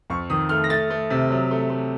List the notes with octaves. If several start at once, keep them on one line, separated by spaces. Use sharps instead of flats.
F2 C#6
D#3 D#6
A3 F6
A#6
A3 A6
A3
C3
F#3
A3
A3